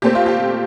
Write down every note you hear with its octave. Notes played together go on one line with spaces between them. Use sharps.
A#2 A3 C4 G4
F4
G4